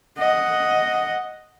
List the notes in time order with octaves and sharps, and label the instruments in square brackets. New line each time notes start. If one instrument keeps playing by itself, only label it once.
[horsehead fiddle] D#5 F#5